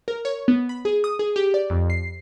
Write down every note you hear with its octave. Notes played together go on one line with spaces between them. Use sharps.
A#4
C#5
B3
B5
G#4
D#6
G#4
G4
D5
F2
C7